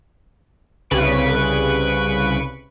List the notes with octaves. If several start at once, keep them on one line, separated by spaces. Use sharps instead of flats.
C2 C#3 B4 C#6 D7